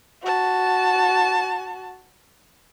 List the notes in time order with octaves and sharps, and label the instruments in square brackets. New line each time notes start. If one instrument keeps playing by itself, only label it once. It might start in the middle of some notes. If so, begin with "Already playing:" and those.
[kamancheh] F#4 A5